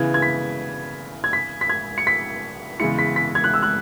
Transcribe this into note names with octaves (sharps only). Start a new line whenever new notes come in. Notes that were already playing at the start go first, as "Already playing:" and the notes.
Already playing: C#3 E3 B3 E4 G#6
G#6
B6
G#6
B6
B6
G#6
C#7
B6
E2 C#3 G#3 E4 C#7
B6
B6
G#6
F#6
E6
F#6